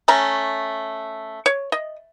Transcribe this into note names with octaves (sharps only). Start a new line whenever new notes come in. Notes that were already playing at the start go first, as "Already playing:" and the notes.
A3 C#4 A#5
C#5
D#5